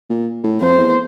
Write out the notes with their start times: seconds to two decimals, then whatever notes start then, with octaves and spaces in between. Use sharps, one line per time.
0.09 A#2
0.43 A2
0.61 F2 C5
0.78 E2